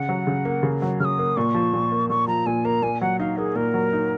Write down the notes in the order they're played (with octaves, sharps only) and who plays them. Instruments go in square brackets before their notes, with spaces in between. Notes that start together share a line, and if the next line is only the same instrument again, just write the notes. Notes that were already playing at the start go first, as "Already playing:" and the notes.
Already playing: [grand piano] C#3 [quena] F#5
[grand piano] F#3
C#3
A#3
C#3
F#3
[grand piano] C#3 [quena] D#6 F6
[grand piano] A#3
[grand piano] A#2 [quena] C#6
[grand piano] F3
A#2
A#3
[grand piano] A#2 [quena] C#6
[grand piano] F3 [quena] A#5
[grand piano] A#2 [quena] G#5
[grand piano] A#3 [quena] A#5
[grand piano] A#2 [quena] G#5
[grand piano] F#3 [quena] F#5
[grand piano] D#4 [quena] F5
[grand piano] A#3 [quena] G#4
[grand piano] A#2 [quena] A#4
[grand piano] F#3
D#4